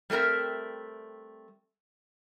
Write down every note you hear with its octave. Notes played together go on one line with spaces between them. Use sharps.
G3 A3 C4 A#4 E5